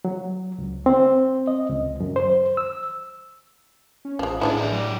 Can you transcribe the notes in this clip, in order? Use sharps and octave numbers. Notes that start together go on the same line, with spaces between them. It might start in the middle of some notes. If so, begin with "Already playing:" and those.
F#3
C#2
C4
D#5
C#2
F#2
C5
E6
C#4
A1 F3 G#3
A2 D#3 G#3 D4 E4 A4
G#4 D5
F#3 D5